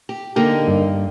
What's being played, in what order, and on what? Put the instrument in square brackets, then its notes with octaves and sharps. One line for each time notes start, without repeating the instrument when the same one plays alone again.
[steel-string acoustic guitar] G4
[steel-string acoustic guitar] D3 A#3 D#4 [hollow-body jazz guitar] G4
[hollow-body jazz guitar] G2